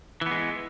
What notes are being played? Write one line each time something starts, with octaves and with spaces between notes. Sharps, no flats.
E3 G#3 B3